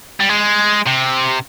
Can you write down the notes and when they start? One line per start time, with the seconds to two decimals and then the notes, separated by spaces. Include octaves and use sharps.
0.20 G3
0.29 G#3
0.86 C3